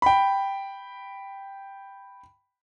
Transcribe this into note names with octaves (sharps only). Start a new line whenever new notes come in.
G5 B5